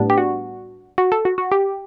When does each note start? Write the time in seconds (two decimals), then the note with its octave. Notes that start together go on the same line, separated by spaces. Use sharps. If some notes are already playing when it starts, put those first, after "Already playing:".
Already playing: A2 G3 B3 D4
0.10 G4
0.18 F#4
0.98 F#4
1.12 A4
1.25 F#4
1.38 F#4
1.52 G4